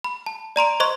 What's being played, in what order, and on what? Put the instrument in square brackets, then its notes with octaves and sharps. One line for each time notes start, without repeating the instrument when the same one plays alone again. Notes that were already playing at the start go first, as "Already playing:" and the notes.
[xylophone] B5
A5
D5 A#5 C6 D7
C5 D#5 C6 C#6